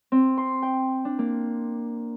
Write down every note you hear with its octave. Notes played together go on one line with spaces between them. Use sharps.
C4
C6
G5
D4
A#3